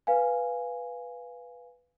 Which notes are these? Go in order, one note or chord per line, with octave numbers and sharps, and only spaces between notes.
B4 F5 G#5